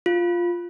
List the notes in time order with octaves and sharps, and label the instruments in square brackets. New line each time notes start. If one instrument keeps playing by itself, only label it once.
[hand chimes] F4